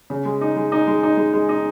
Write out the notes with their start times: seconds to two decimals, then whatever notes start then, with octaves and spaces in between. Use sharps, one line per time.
0.10 C#3
0.25 G#3
0.41 D#4
0.56 G#3
0.72 D#4
0.87 G#3
1.03 D#4
1.17 G#3
1.33 G#3
1.49 D#4